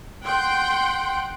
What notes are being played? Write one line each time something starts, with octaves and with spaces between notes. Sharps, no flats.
F#5 G5 C6